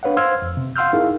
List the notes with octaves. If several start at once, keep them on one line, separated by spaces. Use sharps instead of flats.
D4 B4 C#5 F5 F#5
C5 F5 C6 E6 F6 G#6
F2
C3
F5 F#5 C6 E6 F6 G6
D#4 E4 G#4 A#4 F5